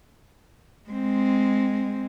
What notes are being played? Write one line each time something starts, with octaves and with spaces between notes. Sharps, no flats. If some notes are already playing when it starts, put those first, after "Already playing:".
G#3 C4